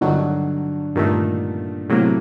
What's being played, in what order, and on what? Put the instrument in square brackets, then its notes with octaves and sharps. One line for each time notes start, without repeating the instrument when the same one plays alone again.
[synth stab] G2 D#3 F#3 [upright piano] D3 D4
[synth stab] G2 D#3 A3 [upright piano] A#2 A#3
[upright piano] A2 A3 [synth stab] C3 F#3 A#3